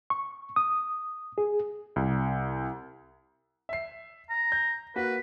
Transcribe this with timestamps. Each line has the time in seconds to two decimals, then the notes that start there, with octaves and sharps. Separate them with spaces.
0.10 C#6
0.56 D#6
1.38 G#4
1.96 C2
3.69 E5 C7
4.30 A#5
4.52 G6
4.96 A#3 F#4 B4